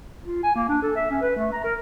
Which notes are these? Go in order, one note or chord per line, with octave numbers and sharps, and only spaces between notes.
F4
G#5
A#3
D4
A4
E5
C#4
B4
A3
A#5
A#4